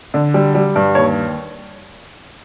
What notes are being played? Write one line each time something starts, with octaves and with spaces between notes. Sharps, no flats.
D3
G3
G3
G2
D#2 C#5